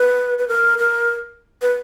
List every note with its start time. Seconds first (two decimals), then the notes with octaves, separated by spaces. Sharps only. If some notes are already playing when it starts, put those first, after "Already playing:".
Already playing: B4
0.39 B4
0.48 A#4
0.78 A#4
1.62 B4